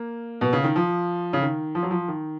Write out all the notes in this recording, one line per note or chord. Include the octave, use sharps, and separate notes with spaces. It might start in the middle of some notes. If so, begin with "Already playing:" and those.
Already playing: A#3
B2
C#3
D#3
F3
C#3
D#3
F3
F#3
F3
D#3